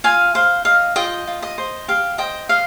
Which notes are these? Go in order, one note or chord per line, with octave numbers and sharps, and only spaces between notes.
F4 F5 G#5
C5 F5
D#5 F5
F4 D#5 G5
F4
D#5
C5
G4 F5
C5 D#5 G5
D#5 F5